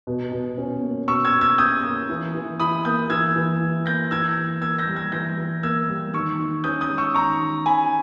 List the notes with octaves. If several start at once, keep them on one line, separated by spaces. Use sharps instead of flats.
B2
B2
C#4
A#3
B2 C#6 E6
E6 G#6
B2
E6 G#6
C#4 D#6 G6
A#3
E3
E3
E4 B5 D#6
A#3 D#6 G6
E3 E6 G#6
E3
E4
A#3 G6 A#6
E3 E6 G#6
E3
A#3 E6 G#6
G6 A#6
G3
E6 G#6
E3 G6 A#6
E3
A#3 E6 G#6
G3
D#3 C#6 E6
D#3
C#4 D#6 G6
D#6 G6
G#3
C#6 E6
D#3 A#5 C#6
D#3
C#4 G#5 B5